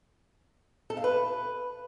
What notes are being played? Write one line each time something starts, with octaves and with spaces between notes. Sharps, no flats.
A4
F5
B4